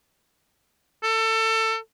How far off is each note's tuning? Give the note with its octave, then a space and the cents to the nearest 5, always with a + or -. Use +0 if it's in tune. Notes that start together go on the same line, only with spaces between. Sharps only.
A4 +25